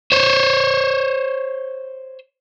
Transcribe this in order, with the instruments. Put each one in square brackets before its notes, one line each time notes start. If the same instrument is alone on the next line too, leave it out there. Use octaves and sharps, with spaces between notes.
[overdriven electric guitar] C5 C#5